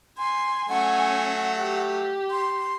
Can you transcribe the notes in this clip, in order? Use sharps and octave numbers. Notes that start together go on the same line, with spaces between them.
G#5 C6
F#3 A3 C#4 F#5 G#5
G4
C6